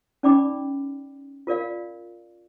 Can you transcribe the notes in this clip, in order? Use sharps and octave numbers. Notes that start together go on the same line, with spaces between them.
C#4 D#4 D5 G5 B5 D6
F4 A#4 D5 F5